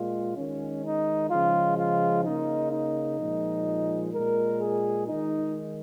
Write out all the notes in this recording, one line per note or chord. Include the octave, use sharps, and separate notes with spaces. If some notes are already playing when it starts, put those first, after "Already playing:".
Already playing: A#2 G#3 F4
D#3 G#3 C#4
D#4
C#3 F3 G#3 F4
F4
C#3 A#3 D#4
D#4
A#2 F3 G#3
A#2 G#3 A#4
G#4
D#3 G#3 D#4